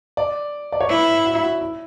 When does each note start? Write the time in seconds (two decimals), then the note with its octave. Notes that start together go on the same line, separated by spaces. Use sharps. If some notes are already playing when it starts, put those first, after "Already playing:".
0.17 D5
0.72 D5
0.81 C#5
0.89 E4 B4
1.25 F#4
1.43 F#4
1.61 E4